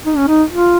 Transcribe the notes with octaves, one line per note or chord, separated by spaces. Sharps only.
D#4
C#4
D#4
F4